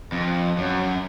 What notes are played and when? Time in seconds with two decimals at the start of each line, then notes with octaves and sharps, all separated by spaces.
0.12 F2
0.58 F#2